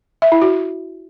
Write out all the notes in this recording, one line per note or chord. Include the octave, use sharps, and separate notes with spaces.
E5
E4
F#4